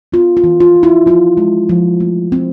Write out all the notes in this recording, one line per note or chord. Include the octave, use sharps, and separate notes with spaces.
B3 F4
F4
E3
F4
E3
E4
F3 F4
G#3
F3
A3
C4